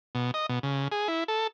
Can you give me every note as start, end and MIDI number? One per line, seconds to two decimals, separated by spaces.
0.15 0.31 47
0.34 0.46 75
0.49 0.59 47
0.63 0.88 49
0.92 1.08 68
1.08 1.24 64
1.28 1.47 69